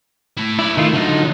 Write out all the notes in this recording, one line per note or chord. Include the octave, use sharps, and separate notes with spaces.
A3 E4
E4 B4 D5
D#3 A3 E4 F4
D3 F#3 D#4 F4